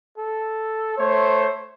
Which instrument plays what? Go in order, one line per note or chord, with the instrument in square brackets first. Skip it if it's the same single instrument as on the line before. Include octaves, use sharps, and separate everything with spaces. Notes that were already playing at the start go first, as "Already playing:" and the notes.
[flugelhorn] A4
[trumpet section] A3 C5 [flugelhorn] C#5